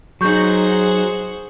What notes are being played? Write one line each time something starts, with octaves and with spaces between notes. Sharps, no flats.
F#3 D#4 G#4 C5 F#5 C#6 G6